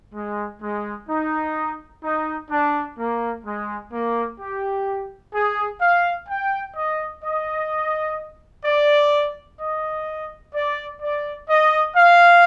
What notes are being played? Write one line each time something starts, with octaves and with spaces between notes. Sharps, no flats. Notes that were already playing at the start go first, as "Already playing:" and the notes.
G#3
G#3
D#4
D#4
D4
A#3
G#3
A#3
G4
G#4
F5
G5
D#5
D#5
D5
D#5
D5
D5
D#5
F5